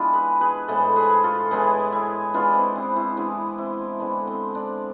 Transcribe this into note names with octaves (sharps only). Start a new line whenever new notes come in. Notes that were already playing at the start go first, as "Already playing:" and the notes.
Already playing: E3 G#3 B3 D4 F4
G#4 B4
G#4 B4
A2 E3 G#3 B3 A4 C5
G#4 B4
F4 A4
A2 E3 G#3 B3 E4 G#4
E4 G#4
E3 G#3 B3 D4 F4
C4 E4
C4 E4
C4 E4
E3 G#3 B3 D4
C4 E4
D3 G#3 B3 D4
C4
D4